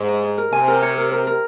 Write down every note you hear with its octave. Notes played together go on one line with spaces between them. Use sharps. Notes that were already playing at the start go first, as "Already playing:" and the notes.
Already playing: G#2
D#5
D#5
A#4
C3 G#5
A#4
C#5
A#4
A#4
A#4